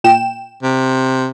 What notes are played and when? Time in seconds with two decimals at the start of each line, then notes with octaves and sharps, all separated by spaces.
0.04 A#2 G5 E7
0.63 C3